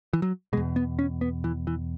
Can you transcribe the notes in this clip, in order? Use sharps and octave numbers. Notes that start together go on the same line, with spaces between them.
E3
F#3
E2 B2 G#3
B3
C#4
B3
E3
E3